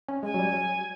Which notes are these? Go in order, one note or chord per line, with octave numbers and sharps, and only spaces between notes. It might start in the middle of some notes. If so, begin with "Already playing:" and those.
C#4
G#3 G#5
F#3
G3
F#3